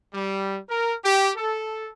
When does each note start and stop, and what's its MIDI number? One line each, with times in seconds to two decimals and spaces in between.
0.14 0.58 55
0.69 0.94 70
1.04 1.31 67
1.36 1.91 69